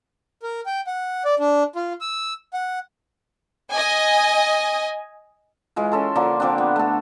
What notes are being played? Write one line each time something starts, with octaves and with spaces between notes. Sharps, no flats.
A#4
G5
F#5
D5
D4
F4
E6
F#5
D#5 G#5
E3 G#3 F4
C#4 A4 C6
D3 F3 A#3 D4
D3 F3 C4 D4
B3
A3 A4